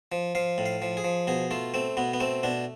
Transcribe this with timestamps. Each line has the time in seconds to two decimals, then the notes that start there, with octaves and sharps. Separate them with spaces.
0.12 F3
0.35 F3 F5
0.58 A2
0.66 F5
0.82 F3
0.97 G#4
1.04 F3
1.27 B2 G#4
1.51 A3 F4
1.74 A3 C4
1.97 B2 B3
2.14 B3
2.20 A3 C4
2.43 B2 D4